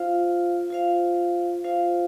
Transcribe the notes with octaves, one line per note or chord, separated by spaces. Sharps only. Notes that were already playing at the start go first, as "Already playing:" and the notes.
Already playing: F4 C5 F5
F4 C5 F5
F4 C5 F5